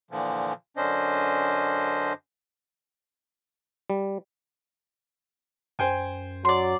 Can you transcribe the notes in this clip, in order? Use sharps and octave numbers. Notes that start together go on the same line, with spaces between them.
A#2 D3 E3 F3
F#2 D3 C#4 D4 C5 D#5
G3
F#2 C5 G5 G#5
F#3 D5 C6